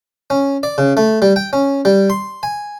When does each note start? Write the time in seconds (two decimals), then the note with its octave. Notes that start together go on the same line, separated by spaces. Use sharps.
0.30 C#4
0.63 D5
0.78 C#3
0.97 A3
1.22 G3
1.36 G5
1.53 C#4
1.85 G3
2.10 C6
2.43 G#5